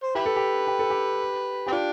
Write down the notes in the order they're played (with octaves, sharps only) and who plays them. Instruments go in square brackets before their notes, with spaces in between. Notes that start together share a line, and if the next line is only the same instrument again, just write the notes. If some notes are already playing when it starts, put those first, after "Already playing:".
[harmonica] C5
[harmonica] E4 B4 [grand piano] G4
[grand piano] A4
G4
G4
A4
G4
[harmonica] C4 [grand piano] G4
[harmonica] D4 [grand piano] F4